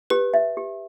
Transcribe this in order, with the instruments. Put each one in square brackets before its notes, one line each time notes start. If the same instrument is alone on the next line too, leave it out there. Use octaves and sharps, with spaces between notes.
[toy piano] G4 [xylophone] B4
[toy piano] E5
G4